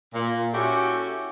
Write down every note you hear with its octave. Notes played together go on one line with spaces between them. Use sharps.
A#2
C#4 E4 F#4 G4 A4